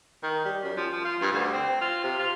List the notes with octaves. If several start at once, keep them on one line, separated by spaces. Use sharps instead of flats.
D#3
G3
F#2
F3
F3
F4
G2
D2
C4
F4
C3
F4